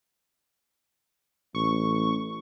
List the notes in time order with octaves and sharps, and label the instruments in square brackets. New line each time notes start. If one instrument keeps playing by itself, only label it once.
[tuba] A1 [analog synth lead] C#6